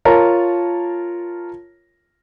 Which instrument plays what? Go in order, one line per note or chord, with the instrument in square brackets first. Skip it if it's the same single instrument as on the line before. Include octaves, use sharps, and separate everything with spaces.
[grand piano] F4 A#4 C#5 A5 A#5